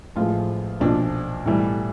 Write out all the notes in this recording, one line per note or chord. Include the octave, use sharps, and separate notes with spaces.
A1 A2 F3 G#3 F4
B1 A#2 F3 D4
B1 A2 E3 G3